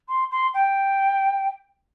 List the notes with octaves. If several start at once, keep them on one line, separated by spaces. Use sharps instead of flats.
C6
C6
G5